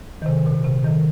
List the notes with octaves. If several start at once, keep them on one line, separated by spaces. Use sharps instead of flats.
D#3
C3
A#2
C3
D#3